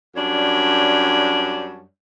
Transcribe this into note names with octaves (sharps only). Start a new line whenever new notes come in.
F#2 G3 D4 C#5